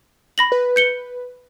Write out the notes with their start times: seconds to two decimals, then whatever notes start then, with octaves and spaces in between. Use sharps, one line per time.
0.38 B5 A#6 F#7
0.52 B4
0.76 G6 C#7 G7